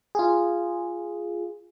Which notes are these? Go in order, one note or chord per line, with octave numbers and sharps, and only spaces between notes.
F4 G#4